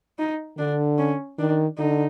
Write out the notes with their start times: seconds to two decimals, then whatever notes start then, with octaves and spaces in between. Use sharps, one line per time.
0.19 D#4
0.58 D3 D4
0.98 C#4
1.38 D#3 D4
1.78 D3 D#4